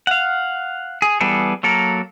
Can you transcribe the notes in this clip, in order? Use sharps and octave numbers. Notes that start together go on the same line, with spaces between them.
F5 F#5
G#4
E3 G3 B3 G#4 A4
F#3 A#3 A4 A#4